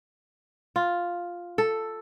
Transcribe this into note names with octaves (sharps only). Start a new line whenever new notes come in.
F4
A4